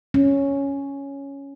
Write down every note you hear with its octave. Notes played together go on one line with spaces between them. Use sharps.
C#4